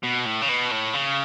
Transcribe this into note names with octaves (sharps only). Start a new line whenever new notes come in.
B2
A2
C#3
B2
A2
C#3